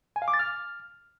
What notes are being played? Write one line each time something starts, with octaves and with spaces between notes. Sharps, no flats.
G#5
F5
D6
A6
F6